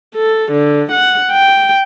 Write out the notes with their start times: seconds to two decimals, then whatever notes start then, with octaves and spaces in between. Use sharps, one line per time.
0.15 A4
0.52 D3
0.92 F#5
1.32 G5